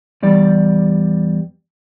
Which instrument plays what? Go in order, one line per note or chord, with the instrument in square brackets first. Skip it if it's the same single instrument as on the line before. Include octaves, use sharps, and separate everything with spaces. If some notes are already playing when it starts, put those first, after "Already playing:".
[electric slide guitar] E2 G3 D5